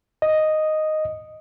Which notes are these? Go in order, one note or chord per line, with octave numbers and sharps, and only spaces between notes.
D#5